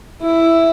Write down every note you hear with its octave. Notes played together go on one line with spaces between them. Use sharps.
E4